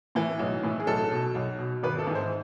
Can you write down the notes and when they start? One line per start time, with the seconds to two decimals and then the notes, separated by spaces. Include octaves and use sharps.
0.15 A2 E3
0.39 B1
0.63 A2 E3
0.80 G#4
0.87 B1 A4
1.11 B2
1.35 B1
1.59 B2
1.83 G#1 B4
1.99 A4
2.07 G#2 E3
2.15 C5